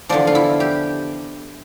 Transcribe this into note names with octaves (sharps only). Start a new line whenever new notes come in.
E2 D3 F3 D5
F4
E4
G4